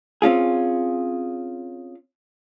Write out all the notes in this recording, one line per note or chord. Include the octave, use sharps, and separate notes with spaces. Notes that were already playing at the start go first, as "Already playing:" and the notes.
C4 C#4 F4 G#4